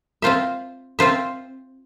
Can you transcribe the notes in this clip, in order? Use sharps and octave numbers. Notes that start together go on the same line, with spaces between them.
C4 F4 C5 E5
C4 F4 C5 E5